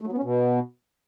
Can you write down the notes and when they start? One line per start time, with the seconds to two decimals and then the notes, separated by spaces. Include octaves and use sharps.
0.01 A3
0.07 F#3
0.12 B3
0.18 C#4
0.23 B2